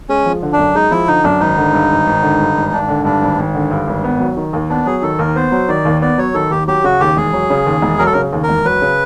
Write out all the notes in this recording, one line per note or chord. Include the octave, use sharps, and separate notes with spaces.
G#3 C#4
F3
D3
D4
F#2
G#3 D#4
F3 E4
D3 D#4
F#2 D4
G#1 D#4
D3
G2
G#1
G#1
D3
G2
G#1
G#1 D4
D3
G2 D4
G#1
G#1
D3
G2
G#1
B3
F#3
D#3
D#2
B3 D4
F#3 G#4
D#3 A4
D#2 A#4
B3 C5
F#3
D#3 D5
D#2
B3 D5
F#3 C#5
D#3 A4
D#2 G4
F#3 G4
C#3 F#4
D#2 G4
E1 G#4
F#3
C#3
D#2
E1
F#3 A#4
A4
C#3 A#4
D#2
A#4
E1
F#3 B4
C#3